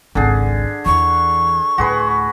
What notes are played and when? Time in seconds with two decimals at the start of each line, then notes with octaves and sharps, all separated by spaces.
0.15 G#1 C#2 D3 G#4
0.86 E2 E3 C#6
1.78 D2 A2 F#4 G#4 B4